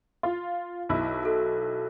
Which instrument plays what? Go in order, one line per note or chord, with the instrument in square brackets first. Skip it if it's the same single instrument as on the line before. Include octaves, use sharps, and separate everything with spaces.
[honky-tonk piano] F4
B1 E4
[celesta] F#4 A4